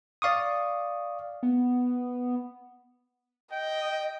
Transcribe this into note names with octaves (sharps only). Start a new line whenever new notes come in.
D5 F5 C#6 D#6
B3
D#5 G5